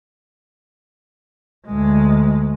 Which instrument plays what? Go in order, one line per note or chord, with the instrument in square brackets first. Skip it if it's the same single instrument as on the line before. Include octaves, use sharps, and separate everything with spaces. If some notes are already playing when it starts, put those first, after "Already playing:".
[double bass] D2 G#3